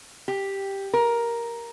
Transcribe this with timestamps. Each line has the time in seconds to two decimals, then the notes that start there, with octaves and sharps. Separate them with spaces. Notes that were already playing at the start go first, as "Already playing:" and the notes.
0.28 G4
0.94 A#4